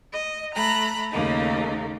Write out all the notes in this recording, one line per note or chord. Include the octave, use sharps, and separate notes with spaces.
D#5
A3 A#5 B5 F#6
D#2 C#3 A3 A#3 D#4